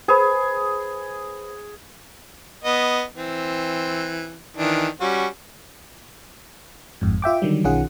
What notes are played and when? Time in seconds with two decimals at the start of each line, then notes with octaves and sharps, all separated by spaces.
0.08 G#4 B4 C5 B5
2.64 B3 D#5
3.16 E3 C4
4.57 D#3 E3 D4
5.01 G3 C#4 F#4
7.01 G1 F2 G#2
7.22 F4 E5 G5 D6
7.42 D3 D#3 F#3 G3
7.64 B1 D#3 C#4 F4 G#4 F#5